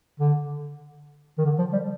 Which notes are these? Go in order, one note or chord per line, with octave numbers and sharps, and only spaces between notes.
D3
D#3
D3
F3
G3